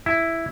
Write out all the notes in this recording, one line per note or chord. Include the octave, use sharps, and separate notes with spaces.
E4